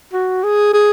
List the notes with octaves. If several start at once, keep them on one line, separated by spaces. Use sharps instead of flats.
F#4
G#4
G#4